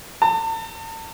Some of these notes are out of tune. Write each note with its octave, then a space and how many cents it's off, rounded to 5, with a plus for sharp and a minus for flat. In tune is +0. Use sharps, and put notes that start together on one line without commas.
A5 +40